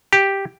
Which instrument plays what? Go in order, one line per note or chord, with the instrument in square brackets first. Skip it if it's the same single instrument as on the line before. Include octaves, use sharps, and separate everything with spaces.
[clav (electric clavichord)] G4